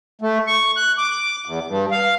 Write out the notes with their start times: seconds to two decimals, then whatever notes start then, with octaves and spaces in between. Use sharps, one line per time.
0.21 A3
0.47 C#6
0.77 F#6
0.98 D6
1.45 E2
1.68 G2
1.91 F5